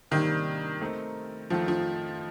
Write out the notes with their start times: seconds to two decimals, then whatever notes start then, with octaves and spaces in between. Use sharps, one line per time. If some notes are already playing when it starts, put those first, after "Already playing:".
0.11 C3 D#3 G3 A#3 D4 G4
0.81 A3 C4 D#4 A#4
1.50 F2 D#3 F3 A3
1.68 F3